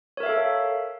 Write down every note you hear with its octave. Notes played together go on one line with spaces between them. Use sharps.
A4 A#4 C#5 E5 F5